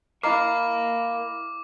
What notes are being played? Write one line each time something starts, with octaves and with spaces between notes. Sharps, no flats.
E4 A#4 D#5 F5 A#5 D6 F6 C7